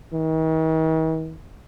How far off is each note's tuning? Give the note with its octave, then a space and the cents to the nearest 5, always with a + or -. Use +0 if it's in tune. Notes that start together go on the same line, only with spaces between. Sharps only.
D#3 +45